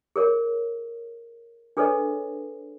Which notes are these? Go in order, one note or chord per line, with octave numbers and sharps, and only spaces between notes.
G#4 A#4 C#5
D4 G#4 A4 B4 C#5 D#5